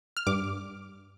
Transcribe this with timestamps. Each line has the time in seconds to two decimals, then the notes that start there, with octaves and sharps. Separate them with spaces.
0.17 F6
0.27 G2 D6